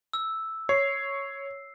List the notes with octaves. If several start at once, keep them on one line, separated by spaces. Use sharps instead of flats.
E6
C#5 C7